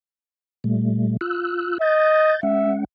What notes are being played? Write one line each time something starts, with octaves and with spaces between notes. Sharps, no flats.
A#2 G3 A3
F4 E6 F#6
D#5 G6 A6
G#3 C#4 E5 F#5